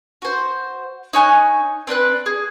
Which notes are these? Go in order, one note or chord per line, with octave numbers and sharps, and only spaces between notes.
F#4 C5
D#4 C#5 G#5 F#6
C4 D4 B4 F#6
G#4